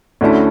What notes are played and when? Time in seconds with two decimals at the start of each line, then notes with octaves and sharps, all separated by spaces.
0.21 D2 D3 A3 C#4 E4